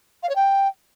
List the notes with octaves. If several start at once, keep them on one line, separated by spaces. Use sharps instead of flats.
F5
C#5
G5